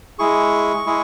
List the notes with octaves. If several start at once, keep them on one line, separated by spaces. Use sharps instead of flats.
G#3 E4 G#4 C#6
G#3 E4 G#4